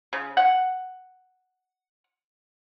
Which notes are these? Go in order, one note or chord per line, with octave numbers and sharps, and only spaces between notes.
C#3
F#5